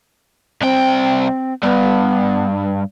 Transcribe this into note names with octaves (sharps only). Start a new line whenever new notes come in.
C2 C4 G5
G2 B3